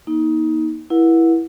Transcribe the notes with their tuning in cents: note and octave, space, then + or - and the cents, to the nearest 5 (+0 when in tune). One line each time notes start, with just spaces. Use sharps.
A#3 +40 D#4 +20
E4 +0 A#4 +45 F#5 -25